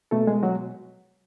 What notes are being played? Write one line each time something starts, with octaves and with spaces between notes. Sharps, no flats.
B2 A3 A4
G#3 G#4
F#3 F#4